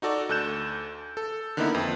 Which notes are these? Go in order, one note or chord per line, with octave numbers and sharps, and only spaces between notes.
D#4 F#4 A4 D5 C#6
D2 A4 F#6 G6 E7
A4
D3 D#3 A#3 B3 D#4 E4
F2